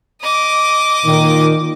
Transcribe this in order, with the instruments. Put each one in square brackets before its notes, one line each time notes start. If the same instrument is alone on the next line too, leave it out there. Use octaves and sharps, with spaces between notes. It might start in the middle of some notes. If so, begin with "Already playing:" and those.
[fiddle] D#5 D6
[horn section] A#2 D#3